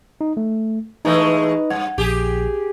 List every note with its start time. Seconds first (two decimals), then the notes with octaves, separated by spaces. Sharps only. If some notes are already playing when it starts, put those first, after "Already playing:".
0.21 D#4
0.37 A3
1.05 E3 G#3 A3 D#4 B4 D#5
1.70 G2 F#5
1.98 A#1 G4 G#4